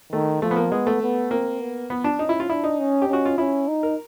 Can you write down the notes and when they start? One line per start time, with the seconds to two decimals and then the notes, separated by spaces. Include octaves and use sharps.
0.12 D#3 A3
0.42 F3 A3
0.51 B3
0.56 A#3
0.71 G#3 B3
0.87 A3
1.02 B3
1.31 A#3 C4
1.61 B3
1.90 B3
2.04 D4
2.19 C#4 D#4
2.29 E4
2.40 F4
2.50 D4 E4
2.64 D#4
2.79 C#4
3.02 G4
3.08 C#4 F#4
3.25 F4
3.38 C#4 E4
3.68 D#4
3.83 A#4